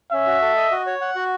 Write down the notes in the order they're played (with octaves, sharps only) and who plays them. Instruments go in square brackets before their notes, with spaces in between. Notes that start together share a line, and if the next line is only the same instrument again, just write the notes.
[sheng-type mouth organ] C#4 [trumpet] E5
[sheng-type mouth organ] F#4
A4
D#5
F#4
C#5
F#5
F#4